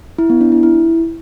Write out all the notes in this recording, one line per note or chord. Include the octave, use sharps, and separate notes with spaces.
E4
B3
D4
E4
E4